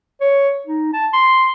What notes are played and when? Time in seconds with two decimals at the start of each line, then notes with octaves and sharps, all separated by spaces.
0.21 C#5
0.66 D#4
0.93 A5
1.13 C6